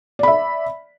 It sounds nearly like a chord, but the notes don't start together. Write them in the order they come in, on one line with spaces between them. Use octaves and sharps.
D5 B5 E5